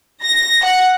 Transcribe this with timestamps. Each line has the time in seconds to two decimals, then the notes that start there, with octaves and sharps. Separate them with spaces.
0.24 A#6
0.65 F#5